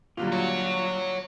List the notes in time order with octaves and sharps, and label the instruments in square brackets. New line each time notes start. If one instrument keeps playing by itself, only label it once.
[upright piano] A#2 D3 G3 [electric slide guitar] F#3 F4
[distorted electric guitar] F#4 C#5